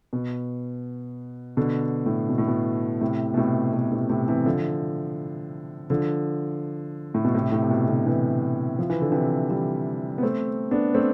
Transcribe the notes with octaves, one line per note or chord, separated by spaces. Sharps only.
B2
B2 D3
A2
B2
A2
B2
A2 C3
B2
A2 C3
B2
A2 C3
A2 C3
C3 E3
D3 F3
D3 F3
A2
B2
A2 C3
A2
C3
B2
B2 D3
C3 E3
F3
E3
D3
C3 E3
E3 G3
B3
A3 C4
B3 D4
A3 C4